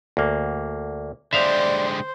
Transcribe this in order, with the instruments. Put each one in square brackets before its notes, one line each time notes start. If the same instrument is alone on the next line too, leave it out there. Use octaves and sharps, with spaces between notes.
[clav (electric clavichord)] D2 A#3
[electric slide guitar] D3 G#3 G4 [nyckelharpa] C5 [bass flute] D5 [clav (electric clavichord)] E5 F5 A#5